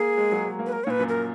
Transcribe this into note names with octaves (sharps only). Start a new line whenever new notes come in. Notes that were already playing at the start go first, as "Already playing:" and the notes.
Already playing: A#3 G#4
G#3
F#3
G#3
A#3
B4
A#4
C#5
A#2
B4
F#2
A#4